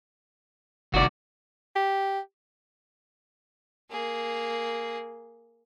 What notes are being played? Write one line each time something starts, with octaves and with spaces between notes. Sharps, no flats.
G1 C2 D#3 F#4 D5
G4
A#3 G#4